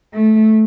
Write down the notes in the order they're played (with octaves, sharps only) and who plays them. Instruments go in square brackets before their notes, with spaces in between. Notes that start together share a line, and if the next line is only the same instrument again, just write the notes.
[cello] A3